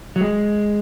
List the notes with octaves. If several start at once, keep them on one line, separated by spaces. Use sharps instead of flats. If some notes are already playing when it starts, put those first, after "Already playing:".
F#3
G#3